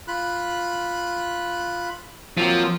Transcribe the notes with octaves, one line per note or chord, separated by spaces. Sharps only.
F4 B5 F#6
F3 F#3 A#3 C4